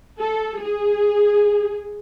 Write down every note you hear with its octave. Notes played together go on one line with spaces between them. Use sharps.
A4
G#4